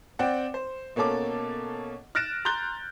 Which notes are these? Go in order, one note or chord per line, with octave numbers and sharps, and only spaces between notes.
C4 D5 F#5 G5
C5
B2 A#3 C#4 A4 D6
F6 F#6 A6 A#6 D7 E7
A#5 C6 F#6 G6 A6 G7